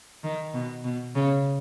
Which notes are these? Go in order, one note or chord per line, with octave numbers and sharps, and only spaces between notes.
D#3
B2
B2
C#3